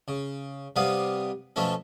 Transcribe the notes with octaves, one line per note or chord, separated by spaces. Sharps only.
C#3
C3 G3 B3 F5 D#6
B2 F3 A3 C#4 A4